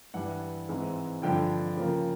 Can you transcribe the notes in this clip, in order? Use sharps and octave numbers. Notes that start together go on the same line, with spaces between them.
G2 E3 G3 F#5
G#2 E3 G#3 C4
G2 D3 F3 G5
C#3 F3 A#3